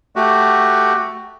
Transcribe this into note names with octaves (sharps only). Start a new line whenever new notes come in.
A3 F#4 G4